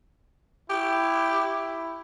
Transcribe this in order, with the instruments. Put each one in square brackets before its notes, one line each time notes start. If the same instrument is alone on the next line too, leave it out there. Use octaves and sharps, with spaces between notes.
[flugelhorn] E4 [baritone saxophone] G4